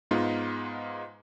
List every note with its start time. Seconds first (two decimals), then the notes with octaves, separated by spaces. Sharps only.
0.11 G#2 G#3 B3 D#4 F4